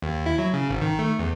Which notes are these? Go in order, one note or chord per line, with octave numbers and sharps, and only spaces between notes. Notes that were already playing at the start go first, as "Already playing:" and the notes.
D#2
E4
F#3
C#3
G#1
D#3
A3
E2